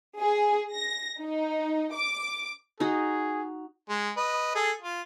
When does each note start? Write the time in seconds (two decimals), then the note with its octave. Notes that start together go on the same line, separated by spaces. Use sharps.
0.20 G#4
0.73 A#6
1.20 D#4
1.94 D6
2.80 D#4 F#4 G#4
3.90 G#3
4.17 B4 D#5
4.55 G#4 A4
4.82 F4